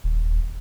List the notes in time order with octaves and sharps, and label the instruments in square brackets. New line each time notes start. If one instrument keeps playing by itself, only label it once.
[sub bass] D#1